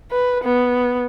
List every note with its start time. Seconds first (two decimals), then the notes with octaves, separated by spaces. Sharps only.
0.11 B4
0.44 B3